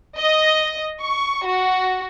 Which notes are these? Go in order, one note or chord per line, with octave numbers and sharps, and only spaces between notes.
D#5
C#6
F#4